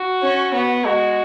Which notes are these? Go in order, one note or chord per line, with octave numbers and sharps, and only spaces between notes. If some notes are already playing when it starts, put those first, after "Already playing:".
Already playing: F#4
C#4
B3
G#3 F#4